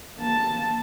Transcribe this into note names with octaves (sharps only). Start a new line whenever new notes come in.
A#3 A5